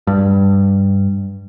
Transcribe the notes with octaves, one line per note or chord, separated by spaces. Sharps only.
G2